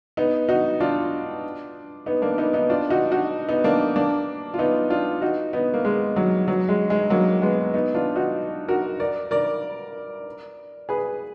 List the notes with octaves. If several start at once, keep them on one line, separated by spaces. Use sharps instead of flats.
B3 D#4
D#4 F#4
D4 F4
B3 D#4
A#3 D4
B3 D#4
B3 D#4
D4 F4
D#4 F#4
D#4 F#4
B3 D#4
A#3 D4
A#3 D4
F4
B3 D#4
D4 F4
D#4 F#4
B3 D#4
A#3
G#3
F#3
F#3
G#3
G#3
F#3 A#3
G#3 B3
B3 D#4
D4 F4
D#4 F#4
F#4 A#4
A#4 D5
A#4 D5
G#4 B4